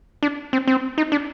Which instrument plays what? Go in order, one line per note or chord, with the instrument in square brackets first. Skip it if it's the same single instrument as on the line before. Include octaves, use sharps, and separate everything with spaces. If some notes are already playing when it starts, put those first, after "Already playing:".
[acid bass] D4
C4
C4
D#4
D4